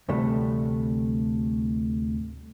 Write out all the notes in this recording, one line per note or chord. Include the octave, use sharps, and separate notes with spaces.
D2 A2 C3 E3 G3 A3